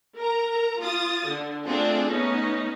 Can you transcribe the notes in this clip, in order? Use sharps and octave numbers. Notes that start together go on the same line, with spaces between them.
A#4 A#5
F4 D#6 A6
D3
A3 C4 D4 F4 G#4 A4
A3 B3 C#4 D#4